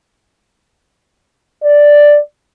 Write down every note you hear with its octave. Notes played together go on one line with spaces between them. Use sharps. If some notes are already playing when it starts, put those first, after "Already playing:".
D5